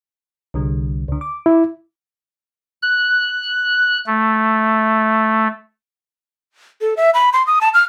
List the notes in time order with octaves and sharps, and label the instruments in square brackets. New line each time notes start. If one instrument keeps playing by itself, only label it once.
[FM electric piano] C2 D3 G3
C#2 D3
D6
[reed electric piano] E4
[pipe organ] F#6
A3
[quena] A4
E5
B5
C6
D#6
A5
F6